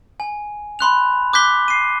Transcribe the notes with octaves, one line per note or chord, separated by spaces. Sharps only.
G#5
B5 C6 F#6 F7
D6 F#6 G6 B6 G7
C7 D#7